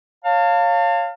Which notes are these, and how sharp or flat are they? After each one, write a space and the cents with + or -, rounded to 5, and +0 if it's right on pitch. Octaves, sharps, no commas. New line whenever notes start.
C#5 +0 F5 +0 A5 +40